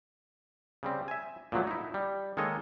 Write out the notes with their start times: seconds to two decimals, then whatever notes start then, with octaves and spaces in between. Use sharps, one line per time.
0.83 C#3 G3 C4
1.08 E5 G#5
1.52 A#2 F3 F#3 A3
1.67 D#4 E4
1.94 G3
2.37 D#3 G#3 A#3 A4 C#5 D#5